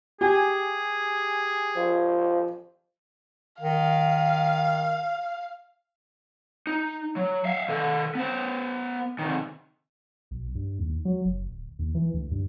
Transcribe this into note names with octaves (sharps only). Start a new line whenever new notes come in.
G4 G#4 G#5
F3
D#3 F5
D#4
F#3
E5 F5
D#3 A4
B3 C5
C3 D#3
B1
G2
D#2
F#3
F#1
D1
D#2
E3
D2
G2